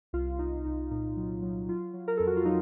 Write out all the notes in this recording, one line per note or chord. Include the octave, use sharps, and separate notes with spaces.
C2 F4
C2 D#4
C2 D#4
A#2 D#4
F#3
F#3
F#3 F4
F#3
A#4
F2 A4
F#4
F4
F#3 D#4